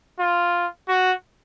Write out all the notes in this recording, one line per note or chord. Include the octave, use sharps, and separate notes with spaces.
F4
F#4